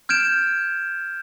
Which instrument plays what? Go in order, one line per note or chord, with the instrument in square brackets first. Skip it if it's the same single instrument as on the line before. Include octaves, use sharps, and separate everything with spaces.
[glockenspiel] F6 G6 G#6 D7 E7